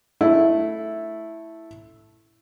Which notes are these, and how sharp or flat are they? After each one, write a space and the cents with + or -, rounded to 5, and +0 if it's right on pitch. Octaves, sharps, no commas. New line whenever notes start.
A3 -5 E4 +0